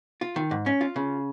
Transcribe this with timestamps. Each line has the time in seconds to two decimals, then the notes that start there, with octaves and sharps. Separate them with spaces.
0.21 F4
0.36 D#3
0.51 G#2
0.66 C#4
0.81 F4
0.96 C#3